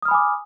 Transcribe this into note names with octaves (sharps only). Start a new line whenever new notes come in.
G#5 B5 D6 D#6 F6